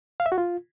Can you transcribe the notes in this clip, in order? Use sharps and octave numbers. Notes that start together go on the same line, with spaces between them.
F5
E5
F#4
F4